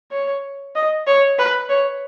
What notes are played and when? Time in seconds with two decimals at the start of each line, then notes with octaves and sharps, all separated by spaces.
0.11 C#5
0.76 D#5
1.07 C#5
1.39 B4
1.69 C#5